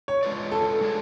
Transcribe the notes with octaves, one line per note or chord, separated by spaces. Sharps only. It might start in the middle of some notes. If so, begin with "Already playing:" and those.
C#5
G#3 D4 F4 B4 D5
A4
G#3 D4 F4 G#4 C#5